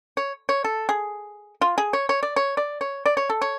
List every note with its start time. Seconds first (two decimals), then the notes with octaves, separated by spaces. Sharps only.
0.17 C#5
0.49 C#5
0.64 A4
0.89 G#4
1.61 F4
1.78 G#4
1.93 C#5
2.09 C#5
2.23 D5
2.36 C#5
2.57 D5
2.81 C#5
3.06 D5
3.17 C#5
3.29 A4
3.42 C#5